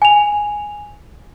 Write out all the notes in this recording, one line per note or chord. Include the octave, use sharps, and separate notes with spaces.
G#5 F7